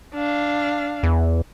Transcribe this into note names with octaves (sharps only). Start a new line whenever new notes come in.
D4 F5
E2